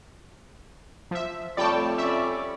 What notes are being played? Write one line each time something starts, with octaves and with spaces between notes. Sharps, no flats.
F3 E5
F2 G3 A3 C#5 D5 G5 A5
C#4 D5 E5